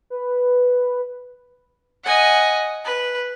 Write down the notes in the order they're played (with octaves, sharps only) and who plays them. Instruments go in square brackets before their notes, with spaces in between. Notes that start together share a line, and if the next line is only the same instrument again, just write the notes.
[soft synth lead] B4
[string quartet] D#5 F#5 G#5
B4